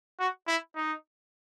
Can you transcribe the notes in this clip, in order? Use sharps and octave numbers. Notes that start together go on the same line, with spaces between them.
F#4
E4
D#4